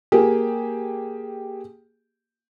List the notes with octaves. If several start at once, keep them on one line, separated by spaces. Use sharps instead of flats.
A#3 G4 G#4